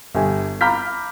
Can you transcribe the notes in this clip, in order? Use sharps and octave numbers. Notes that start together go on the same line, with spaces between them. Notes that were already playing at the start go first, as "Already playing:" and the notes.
G1 G4 G#5
A#5 B5 D6 F6 G6 B6